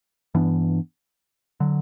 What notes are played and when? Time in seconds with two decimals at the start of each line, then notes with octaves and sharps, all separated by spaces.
0.35 G2 E3 B3 D4
1.60 D3 F#3